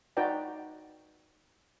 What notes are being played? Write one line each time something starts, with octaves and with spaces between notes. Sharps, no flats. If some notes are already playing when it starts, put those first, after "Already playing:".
D#4 F#4 B4 D5 G5 A#5